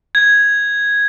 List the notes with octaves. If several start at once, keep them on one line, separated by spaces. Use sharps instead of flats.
G#6